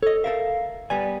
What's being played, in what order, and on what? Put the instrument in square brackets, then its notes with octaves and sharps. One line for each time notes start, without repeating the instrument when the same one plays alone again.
[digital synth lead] A4 [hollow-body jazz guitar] C#5 D#5
[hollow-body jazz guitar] A4 A#4 E5 [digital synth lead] F5
[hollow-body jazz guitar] G3 B3 G#5 [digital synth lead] D5